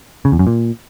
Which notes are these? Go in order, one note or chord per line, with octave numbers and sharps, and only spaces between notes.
C#3
E2
F#2
A#2